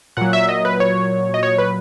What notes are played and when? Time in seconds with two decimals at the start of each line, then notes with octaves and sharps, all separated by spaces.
0.17 A#2 F#3 F#5
0.33 E5
0.49 D#5
0.65 B4
0.80 C#5
1.34 D#5
1.43 C#5
1.58 B4